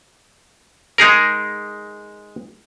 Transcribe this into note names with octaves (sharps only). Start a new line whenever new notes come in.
G#3 D#4 G#4 A#4